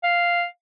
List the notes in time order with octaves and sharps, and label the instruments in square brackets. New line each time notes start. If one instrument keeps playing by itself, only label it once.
[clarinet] F5